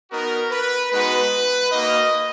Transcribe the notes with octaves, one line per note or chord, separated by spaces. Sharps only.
B3 D#4 F#4 A#4
B4
G#3 B3 D#4 F#4 B4
A#3 D#4 F#4 D#5